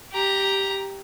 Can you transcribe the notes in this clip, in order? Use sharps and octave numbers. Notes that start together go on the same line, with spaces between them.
G4 A#5